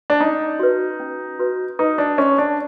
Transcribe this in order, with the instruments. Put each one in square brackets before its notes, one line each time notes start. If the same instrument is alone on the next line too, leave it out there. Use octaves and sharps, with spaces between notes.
[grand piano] D4
[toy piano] C#4 [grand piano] D#4
[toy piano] F#4 B4
C#4
F#4 B4
[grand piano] D#4 [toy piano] B4
[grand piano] D4
[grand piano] C#4 [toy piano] E5 A5 C6
[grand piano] D4